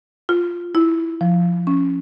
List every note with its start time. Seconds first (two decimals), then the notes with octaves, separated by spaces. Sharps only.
0.29 F4
0.75 E4
1.21 F3
1.67 C#4